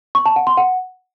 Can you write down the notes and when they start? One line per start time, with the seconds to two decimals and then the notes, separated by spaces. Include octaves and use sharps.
0.15 C#6
0.26 A5
0.36 F#5
0.47 C6
0.57 F#5